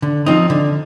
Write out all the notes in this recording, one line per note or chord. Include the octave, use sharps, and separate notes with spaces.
D3
F3 C4 D#4
D3